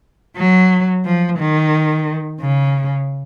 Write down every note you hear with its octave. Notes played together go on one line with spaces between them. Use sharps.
F#3
F3
D#3
C#3